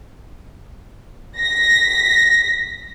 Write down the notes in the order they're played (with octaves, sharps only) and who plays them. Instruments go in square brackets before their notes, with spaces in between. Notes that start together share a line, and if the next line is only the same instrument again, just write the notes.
[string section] A#6 B6